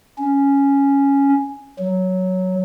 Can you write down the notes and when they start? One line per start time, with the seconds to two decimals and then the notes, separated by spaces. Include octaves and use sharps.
0.18 C#4
1.79 F#3